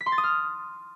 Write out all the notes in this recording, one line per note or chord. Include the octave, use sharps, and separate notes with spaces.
B6
C6
A6
D#6
F6